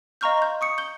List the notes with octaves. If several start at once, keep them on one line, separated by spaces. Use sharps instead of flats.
D#5 F5 A#5 C#6 F6 G6
C6 G6
C#6 D#6 C#7
G6 G7